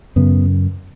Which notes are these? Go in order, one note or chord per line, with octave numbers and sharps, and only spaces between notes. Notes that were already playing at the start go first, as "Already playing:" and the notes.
F#2 C#3 B3